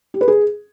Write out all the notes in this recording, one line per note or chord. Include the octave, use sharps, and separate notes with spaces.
G4
B4
G#4